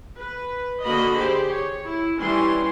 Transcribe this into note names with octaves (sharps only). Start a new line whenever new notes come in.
B4
D3 A#3 F#4 D#5 B5
G4 G#4 C5
C#5
E4
E3 G3 C#4 E4 C6